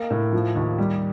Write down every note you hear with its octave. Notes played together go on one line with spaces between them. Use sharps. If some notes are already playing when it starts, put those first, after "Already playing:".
Already playing: A#3
A2
F3
D#2
G3